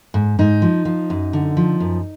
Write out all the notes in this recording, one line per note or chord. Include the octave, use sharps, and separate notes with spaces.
G#2
G#2 D#4
F3
F3
F#2
D3
F3
F#2